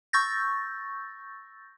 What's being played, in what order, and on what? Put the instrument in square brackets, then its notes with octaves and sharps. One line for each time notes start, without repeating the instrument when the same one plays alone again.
[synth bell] C#6 E6 G6 A6 A#6